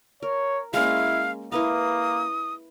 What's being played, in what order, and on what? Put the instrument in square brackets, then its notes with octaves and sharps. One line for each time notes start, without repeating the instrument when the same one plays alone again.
[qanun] A#4 [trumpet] C#5
[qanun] G#3 A#3 C#4 [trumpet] E4 [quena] F5
[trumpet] A#3 [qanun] E4 B4 F5 [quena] D#6